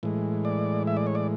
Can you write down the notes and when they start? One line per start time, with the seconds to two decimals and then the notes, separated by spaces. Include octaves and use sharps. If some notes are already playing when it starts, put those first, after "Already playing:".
0.03 A2 E3 G#3
0.45 D5
0.87 E5
0.97 D5
1.07 C#5
1.15 D5